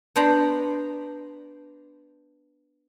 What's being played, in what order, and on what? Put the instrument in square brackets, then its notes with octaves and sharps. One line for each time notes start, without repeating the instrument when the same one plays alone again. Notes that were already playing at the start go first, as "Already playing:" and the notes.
[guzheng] B3 D4 C5 A#5 B5